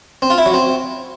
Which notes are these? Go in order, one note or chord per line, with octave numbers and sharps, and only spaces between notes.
C4
F4
E4
F#3
C4